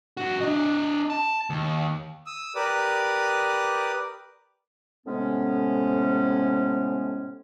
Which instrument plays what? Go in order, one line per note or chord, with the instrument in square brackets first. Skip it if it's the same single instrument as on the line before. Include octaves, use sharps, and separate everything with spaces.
[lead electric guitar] G2 F#4
D4 D#5
A5
D#2
[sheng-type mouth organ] D#6 E6
G4 A#4 B4 D5 D6 D#6
[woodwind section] A2 C3 G#3 B3 C#4